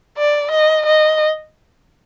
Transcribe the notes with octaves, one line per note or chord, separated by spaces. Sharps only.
D5
D#5
D#5